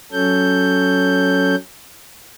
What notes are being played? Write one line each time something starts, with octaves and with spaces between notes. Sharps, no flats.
F#3 C#4 A4 G6